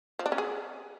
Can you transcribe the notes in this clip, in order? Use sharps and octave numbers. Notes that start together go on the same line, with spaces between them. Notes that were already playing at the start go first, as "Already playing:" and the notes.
F3
D4
C#4
G#4